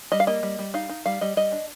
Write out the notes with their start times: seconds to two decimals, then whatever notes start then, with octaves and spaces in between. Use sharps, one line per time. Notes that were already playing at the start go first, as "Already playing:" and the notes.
0.12 G3 D#5
0.20 F5
0.27 A#3 D#5
0.43 G3
0.59 G3
0.74 D#4 F5
0.89 D#4
1.06 G3 F5
1.21 G3 D#5
1.37 G3 D#5
1.52 D4